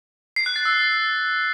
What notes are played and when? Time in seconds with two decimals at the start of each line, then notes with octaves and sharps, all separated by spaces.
0.36 C7
0.46 F#6
0.56 A6
0.65 E6